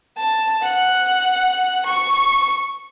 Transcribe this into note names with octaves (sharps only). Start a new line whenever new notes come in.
A5
F#5
C#6